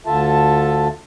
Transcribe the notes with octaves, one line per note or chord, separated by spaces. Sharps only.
D2 D3 F4 A4 E5 A5